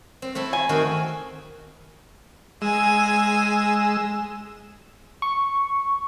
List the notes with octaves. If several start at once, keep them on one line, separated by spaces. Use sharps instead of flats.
C4
A3 C4 E4
G#5
D#3 C4 F#4
G#3 G#5 E6
C#6